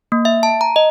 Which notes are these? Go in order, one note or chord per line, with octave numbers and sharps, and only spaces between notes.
A#3
E5
A5
A#5
D#5